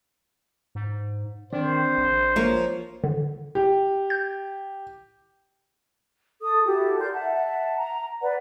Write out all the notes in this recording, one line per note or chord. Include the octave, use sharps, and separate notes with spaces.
G#2
D#3 C4 D4 C5 D5
A#1
F3 A#3 C#5 A#5 C6
D3
G4
G6
A4 D#6
E4 F#4 G4 A4
A#4 D5 C6 G6
E5 F#5 A5
A#5
B4 D5 F#5